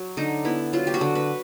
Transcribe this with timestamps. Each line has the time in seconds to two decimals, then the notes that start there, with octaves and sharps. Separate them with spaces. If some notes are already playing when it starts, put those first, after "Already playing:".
Already playing: F#3
0.17 D3 D#4
0.45 B3 E4
0.73 F#3 F4
0.87 G4
0.94 F#4
1.01 D3
1.15 B4